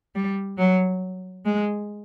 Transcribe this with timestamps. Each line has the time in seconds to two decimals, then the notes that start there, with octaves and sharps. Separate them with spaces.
0.15 G3
0.58 F#3
1.45 G#3